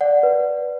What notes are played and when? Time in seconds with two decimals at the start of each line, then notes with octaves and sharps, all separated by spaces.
0.01 D5 F#5
0.23 B4